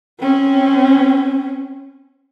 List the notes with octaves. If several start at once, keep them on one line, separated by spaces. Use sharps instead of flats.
C4 C#4